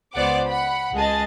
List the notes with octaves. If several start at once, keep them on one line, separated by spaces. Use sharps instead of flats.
C#2 B3 C5 D5 F#5 D6
F#5 B5
C#2 G#3 G#4 D#5 A5 A6